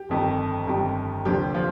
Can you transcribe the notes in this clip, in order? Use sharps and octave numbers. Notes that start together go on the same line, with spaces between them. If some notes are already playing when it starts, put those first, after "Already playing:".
Already playing: G4
G1 F2 D#3 G3
G1 F2 D#3 G3
F1 D#2 D3 F3 G3 G4
F3 F4